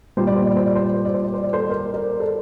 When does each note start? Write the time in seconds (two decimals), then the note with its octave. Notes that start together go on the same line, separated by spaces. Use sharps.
0.17 A#2 G3 C5
0.27 D5
0.36 C5
0.45 D5
0.56 C5
0.66 D5
0.75 C5
0.84 D5
0.94 C5
1.05 D5
1.14 C5
1.24 D5
1.34 C5
1.43 D5
1.53 A4 C5
1.69 A#4 D5
1.94 A#4 D5
2.20 A4 C5